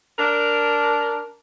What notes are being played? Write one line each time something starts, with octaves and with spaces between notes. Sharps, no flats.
D4 A#4